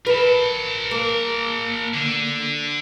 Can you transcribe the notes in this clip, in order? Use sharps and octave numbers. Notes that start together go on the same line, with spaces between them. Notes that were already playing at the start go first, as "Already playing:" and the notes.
A#4 B4 A5
A#3
D3